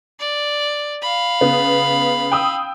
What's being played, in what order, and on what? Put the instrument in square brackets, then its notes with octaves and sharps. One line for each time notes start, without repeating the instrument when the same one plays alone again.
[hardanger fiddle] D5
F5 B5
[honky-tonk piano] C#3 B3
G5 D#6 E6